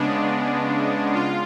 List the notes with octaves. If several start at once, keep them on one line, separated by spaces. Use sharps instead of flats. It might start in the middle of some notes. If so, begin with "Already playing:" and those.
Already playing: C#3 G#3 B3 D4
F4